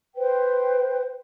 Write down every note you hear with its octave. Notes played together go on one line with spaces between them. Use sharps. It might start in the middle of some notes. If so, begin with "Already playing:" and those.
B4 C5 G5